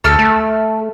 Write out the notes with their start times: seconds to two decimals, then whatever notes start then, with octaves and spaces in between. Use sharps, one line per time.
0.04 D2 A4 E6 F6
0.19 A3